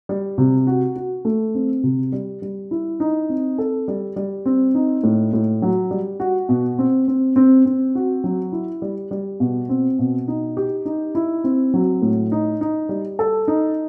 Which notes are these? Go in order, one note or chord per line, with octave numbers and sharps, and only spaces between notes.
G3
C3
F#4
F#4
A3
C4
C3
G3
G3
E4
D#4
C4
A4
G3
G3
C4
D#4
A2
A2
F#3
G3
F#4
B2
C4
C4
C4
C4
F#4
F#3
E4
G3
G3
B2
C4
B2
D#4
G4
D#4
E4
C4
F#3
A2
D#4
D#4
G3
A4
D#4